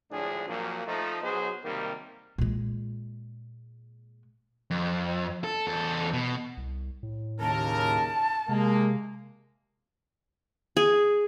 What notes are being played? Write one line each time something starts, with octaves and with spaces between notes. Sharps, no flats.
G#1 D2 A2 F3 D4 G#4
F2 A#2 F3 F#3 A#3
F3 A3 D#4
B1 F#3 B3 D#4 G#4 C5
B1 C3 D#3 G3 A#3 A#4
A#2 G#3
F2
A4
E2 A4
B2
C2
A2
D#2 C#3 A#4 A5
C3 G#3 A#3
G#4